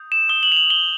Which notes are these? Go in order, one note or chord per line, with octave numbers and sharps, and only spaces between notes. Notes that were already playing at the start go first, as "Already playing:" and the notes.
Already playing: D#6 G6
E7
D#6 G6 G7
F#7
F7
F#7
G7